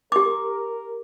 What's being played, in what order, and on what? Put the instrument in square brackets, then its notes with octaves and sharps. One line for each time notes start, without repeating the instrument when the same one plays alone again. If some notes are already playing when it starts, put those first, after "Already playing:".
[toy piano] G4 D6 [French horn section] A#4